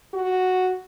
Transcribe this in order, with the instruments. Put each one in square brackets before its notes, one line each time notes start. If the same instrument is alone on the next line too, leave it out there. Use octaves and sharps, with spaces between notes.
[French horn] F#4